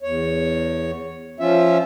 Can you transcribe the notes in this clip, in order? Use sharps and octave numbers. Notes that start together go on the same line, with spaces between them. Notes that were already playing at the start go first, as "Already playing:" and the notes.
E2 C#5
F3 C#4 F4 E5